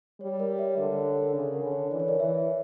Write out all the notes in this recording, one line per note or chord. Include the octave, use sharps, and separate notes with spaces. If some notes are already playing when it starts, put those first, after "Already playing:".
G3 C#5
A#4 D5
C#5 E5
D3 A#4 D5
A#4 D5
C#5
A#4
C#3 C#5
A#4
D3
C#5
E3 D5
C#5
A#4 D5
E3 C#5 E5